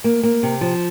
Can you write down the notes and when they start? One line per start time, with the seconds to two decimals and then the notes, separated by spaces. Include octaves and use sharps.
0.04 A#3
0.23 A#3
0.43 C3
0.61 F3